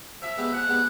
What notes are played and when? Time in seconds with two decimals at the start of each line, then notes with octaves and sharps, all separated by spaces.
0.22 F3 E5
0.37 G#3 B3 D4 G4
0.52 F3 F#5
0.67 G#3 B3 D4 G4